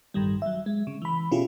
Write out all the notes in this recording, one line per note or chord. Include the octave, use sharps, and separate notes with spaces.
A1 G2 D#3 G3
F#3 E5
G#3
C#3
E3 B5
B2 C#4 E4 F4 G4 G#4